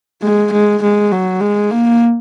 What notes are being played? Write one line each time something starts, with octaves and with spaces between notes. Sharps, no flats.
G#3
G#3
G#3
F#3
G#3
A#3